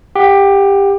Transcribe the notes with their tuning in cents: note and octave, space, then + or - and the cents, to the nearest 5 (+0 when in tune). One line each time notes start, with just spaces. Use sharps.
G4 +15 F#5 +0